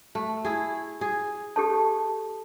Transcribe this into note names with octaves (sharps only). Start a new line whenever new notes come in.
A3
E4 G#4
G#4
G4 A4 A5